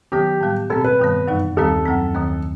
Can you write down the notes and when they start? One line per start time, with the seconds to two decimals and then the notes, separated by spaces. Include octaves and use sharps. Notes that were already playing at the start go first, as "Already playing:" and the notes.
0.12 D#3 F#3 B3 G4
0.41 A2 G3 B3
0.70 B2 A3 C4 A4
0.84 B4
0.99 G2 D#3 G3 B3
1.27 F#2 E3 G3 D#4
1.57 D#2 D#3 G3 C4 A4
1.85 F#2 F#3 A3 C4
2.15 D#2 D#3 A3 C4